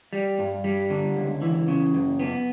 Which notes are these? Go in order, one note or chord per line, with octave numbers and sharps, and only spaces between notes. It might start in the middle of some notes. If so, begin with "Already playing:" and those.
G3
G2
G3
D3
C#2
E3
C#3
F#2
B3